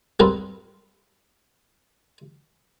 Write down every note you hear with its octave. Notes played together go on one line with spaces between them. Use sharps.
G3 C4 F4 G#4 A#4 B4